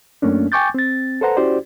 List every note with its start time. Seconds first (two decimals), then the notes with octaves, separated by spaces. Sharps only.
0.22 F#2 A3 A#3 C#4 D4
0.52 G5 G#5 C#6 D6 G6 A6
0.74 C4 A6
1.21 A4 B4 C5 F#5 A#5
1.37 C#4 E4 F#4 G4 C5 D5